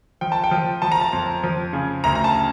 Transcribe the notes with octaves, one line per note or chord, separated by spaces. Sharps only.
F3 G5
A5
G5
F3
F3 A5
A#5
A5
F2
F3
C#3
D2 A#5
A#5
A5